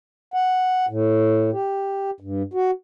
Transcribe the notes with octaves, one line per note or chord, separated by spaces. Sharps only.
F#5
A2
G4
G2
F#4